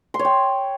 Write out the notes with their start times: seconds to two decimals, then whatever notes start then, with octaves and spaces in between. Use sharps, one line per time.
0.14 C6
0.19 C#5
0.25 G5